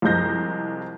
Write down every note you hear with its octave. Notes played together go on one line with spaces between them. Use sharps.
C2 F3 G#3 G6 A#6